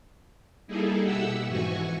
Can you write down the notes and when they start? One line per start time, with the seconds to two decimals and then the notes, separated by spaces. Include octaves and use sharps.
0.67 G3 A#3 D#4 E4 G#4 A4
1.01 B2 E4 G4 E5 F#5 E6
1.47 F2 G#2 E3 F#4 G#5 C#6